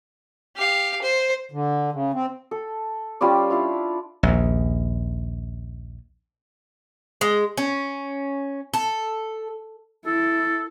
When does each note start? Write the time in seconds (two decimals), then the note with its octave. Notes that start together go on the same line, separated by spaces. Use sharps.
0.56 G4 F5
1.02 C5
1.52 D3
1.92 C#3
2.13 C4
2.51 A4
3.21 G3 C#4 F4 D5
3.50 D4 E4 F4 F5
4.23 A#1 D#2
7.21 G#3
7.57 C#4
8.74 A4
10.06 E4 A4